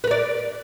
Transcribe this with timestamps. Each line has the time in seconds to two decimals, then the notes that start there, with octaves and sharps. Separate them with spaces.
0.04 B4
0.07 A#4
0.11 D5